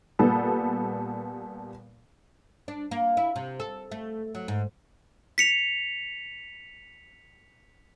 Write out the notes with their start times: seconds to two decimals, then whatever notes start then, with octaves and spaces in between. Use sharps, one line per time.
0.19 A#2 G3 B3 A4
2.68 D4
2.91 A#3
3.17 E4
3.36 C3
3.60 A4
3.91 A3
4.35 F#3
4.48 G#2
5.38 B6 C#7 F7